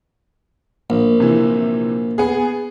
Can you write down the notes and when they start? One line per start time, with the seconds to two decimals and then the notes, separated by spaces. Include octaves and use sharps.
0.90 A#1 A#3
1.20 C3 E3
2.18 B3 G#4